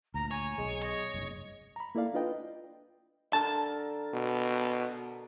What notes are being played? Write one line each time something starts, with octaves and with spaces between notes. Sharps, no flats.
D2 A#2 A#5
C#5 G#5
B1 G#3
C#5 D#5
F#1 C2 G2
A#5 B5
A#3 E4 A4 D5 F5
D4 E4 F4 B4 D#5 G5
D3 A4 A#4 A5
B2